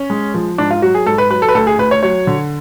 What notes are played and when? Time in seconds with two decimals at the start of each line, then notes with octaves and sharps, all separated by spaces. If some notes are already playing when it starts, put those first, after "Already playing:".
Already playing: C#4
0.10 G#3
0.34 F3
0.58 G#2 D4
0.71 F4
0.82 F#3 F#4
0.95 G#4
1.06 G#2 A4
1.18 B4
1.30 F#3 B4
1.42 A4
1.49 B4
1.55 D2 A4
1.67 G#4
1.78 D2 B4
1.91 C#5
2.03 F#3 C#5
2.27 D3